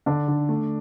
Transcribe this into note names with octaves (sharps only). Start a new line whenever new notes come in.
D3 D4
D3
A3